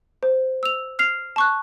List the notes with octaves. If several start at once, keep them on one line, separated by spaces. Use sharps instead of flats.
C5
E6 F7
F6 C7 F7
A5 C#6 F#6